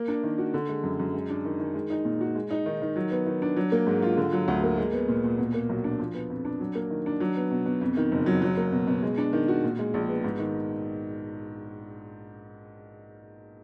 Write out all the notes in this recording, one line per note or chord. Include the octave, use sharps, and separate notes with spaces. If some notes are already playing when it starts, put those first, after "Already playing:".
Already playing: A#3
D4
D#3
F#4
D3
G#3
F#2
F#2
G#3
D4
D#3
D#3
G#3
D#4
A#2
F#4
G#3
D#4
D#3
D#3
F#3
B3
D#3
D4
F#3
A#3
G#2
F4
D3
F#3
D2
A#3
G#3
B3
A#2
A#2
B2
A#3
B1
D4
F3
B3
F2
D4
F#3
A#3
D#3
D4
F#3
B3
B2
B2
F2
D#3
F#1
F#3
F#3
A#3
B2
B2
G#3
D4
D#3
F#4
A#2
G#3
A#1
B3
G#2
D#3